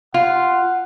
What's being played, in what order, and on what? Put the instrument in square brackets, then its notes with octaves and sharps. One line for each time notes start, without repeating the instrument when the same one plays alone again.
[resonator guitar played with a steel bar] F4 [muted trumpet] F#5